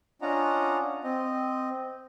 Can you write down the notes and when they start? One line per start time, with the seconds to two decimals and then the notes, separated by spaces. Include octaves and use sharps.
0.22 C#4 D4 F4 D#5 F#5 A#5
1.04 C4 D#5